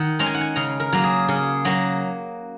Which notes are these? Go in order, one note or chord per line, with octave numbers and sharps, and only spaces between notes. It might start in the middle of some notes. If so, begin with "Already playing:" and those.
Already playing: D#3 F#5
G#3 C#4 A#5
G#5
F#5
G#5
C#3 A#5
A#4
F#3 A#3
G#4
C#3 G#4
F#3 A#3 F#4